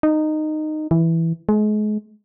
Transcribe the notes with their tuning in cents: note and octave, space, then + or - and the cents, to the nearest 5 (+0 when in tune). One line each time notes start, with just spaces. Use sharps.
D#4 -15
E3 +0
G#3 +35